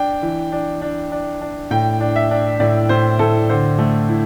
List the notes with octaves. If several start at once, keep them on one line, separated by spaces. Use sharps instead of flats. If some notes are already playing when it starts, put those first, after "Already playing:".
Already playing: D4 G5
E3
D4
D4
D4
D4
A2 G5
D4
E5
D4
A2 D5
A2 C5
A2 A4
D3 C5
A3
E4